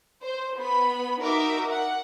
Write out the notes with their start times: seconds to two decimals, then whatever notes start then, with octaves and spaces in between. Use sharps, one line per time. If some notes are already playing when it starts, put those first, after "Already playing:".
0.23 C5
0.58 B3 B5
1.20 D#4 F#4 A#4 E5 D6
1.69 F#5